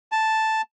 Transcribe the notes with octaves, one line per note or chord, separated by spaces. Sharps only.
A5